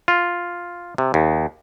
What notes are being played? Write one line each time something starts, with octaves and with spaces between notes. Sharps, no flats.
F4
C3
D#2